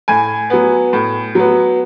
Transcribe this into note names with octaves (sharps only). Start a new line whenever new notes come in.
A2 G#5
F#3 B3
A2
F#3 B3